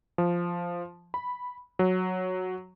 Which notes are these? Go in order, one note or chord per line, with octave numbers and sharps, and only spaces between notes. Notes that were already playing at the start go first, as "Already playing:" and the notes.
F3
B5
F#3